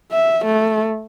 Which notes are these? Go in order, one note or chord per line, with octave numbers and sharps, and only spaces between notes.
E5
A3